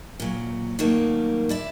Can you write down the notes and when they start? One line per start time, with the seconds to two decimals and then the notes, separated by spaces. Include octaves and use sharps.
0.20 A#2 F#3
0.79 D#3 F#3 G3 A3 A#3
1.49 E4 D5 E5